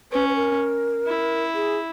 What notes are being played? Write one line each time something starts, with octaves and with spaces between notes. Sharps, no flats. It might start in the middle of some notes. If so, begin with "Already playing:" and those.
C#4 B4
B4
A#4
E4
G#4